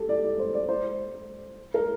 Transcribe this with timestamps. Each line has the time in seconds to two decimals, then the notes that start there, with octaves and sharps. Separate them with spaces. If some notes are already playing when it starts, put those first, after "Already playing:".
Already playing: G4 A4
0.09 D5
0.24 D5
0.39 C5
0.54 D5
0.69 C5
1.74 A#4